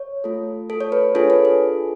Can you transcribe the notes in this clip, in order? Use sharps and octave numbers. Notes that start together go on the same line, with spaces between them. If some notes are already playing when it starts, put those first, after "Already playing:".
Already playing: C#5
A3 F4 A4
A4
C#5
B4
D4 F4 G#4 A4 C#5
B4
A4